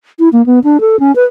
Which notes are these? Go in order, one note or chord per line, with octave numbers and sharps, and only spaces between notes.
E4
A#3
B3
D4
A4
C#4
B4